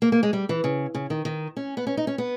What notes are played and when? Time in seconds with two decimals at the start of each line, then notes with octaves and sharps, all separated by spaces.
0.02 A#3
0.12 A#3
0.23 G#3
0.33 G3
0.49 E3
0.64 C#3
0.95 C#3
1.10 D#3
1.25 D#3
1.57 C#4
1.77 B3
1.87 C#4
1.97 D#4
2.07 C#4
2.18 B3